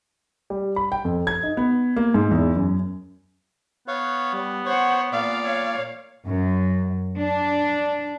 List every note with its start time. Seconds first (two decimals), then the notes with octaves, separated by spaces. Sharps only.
0.50 G3
0.76 B5
0.92 G5
1.05 F2
1.27 G#6
1.43 D#4
1.57 B3
1.96 A#3
2.14 G#2
2.31 E2
2.56 F#2
3.88 B3 C#5 F5
4.33 G3
4.66 C5 C#5 F#5
5.12 A#2 D5 F5
5.45 C#5 F5
6.26 F#2
7.19 D4